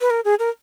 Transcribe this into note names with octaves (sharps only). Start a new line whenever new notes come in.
B4
A#4
G#4
A#4